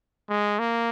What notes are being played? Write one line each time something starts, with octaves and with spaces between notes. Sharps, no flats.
G#3
A#3